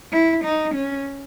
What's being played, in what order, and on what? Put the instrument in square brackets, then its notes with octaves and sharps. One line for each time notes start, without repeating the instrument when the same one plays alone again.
[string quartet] E4
D#4
C#4